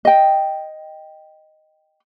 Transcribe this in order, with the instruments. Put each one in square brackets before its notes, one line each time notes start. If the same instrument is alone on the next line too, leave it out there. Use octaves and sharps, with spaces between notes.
[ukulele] D#5 G5